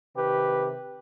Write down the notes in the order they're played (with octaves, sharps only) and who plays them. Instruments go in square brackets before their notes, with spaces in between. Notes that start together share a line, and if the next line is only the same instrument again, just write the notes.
[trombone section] C3 D#3 G4 B4